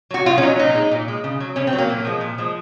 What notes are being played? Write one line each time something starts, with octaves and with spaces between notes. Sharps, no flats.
F#3 F#4
C#3 F4
C#4
F#3 D#4
A#2 D#4
G#3
A#2
G#3
C#3
F#3
C#3 C#4
C4
F#3
A#3
A#2
F3 G#3
A#2
F3 G#3